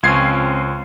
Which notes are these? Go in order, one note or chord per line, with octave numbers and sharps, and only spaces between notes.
C#2 F3 C4 C#4 G#6 C7